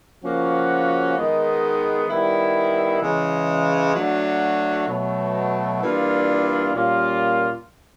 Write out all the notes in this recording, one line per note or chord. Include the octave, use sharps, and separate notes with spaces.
C#3 F3 A#3 C#4 F#4
D#3 G#3 B3
D#3 G3 B3 E4
C#3 E3 G#3
F#3 A3 D4 F#4
B2 F#3 A3
E3 G3 A#3 D4 F4
A#2 G3 A#3 C#4 F4